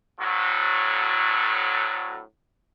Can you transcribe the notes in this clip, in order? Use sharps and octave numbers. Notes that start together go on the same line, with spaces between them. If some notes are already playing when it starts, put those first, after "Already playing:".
D2 A2 F#3